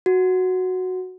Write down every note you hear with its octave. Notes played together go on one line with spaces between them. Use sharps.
F#4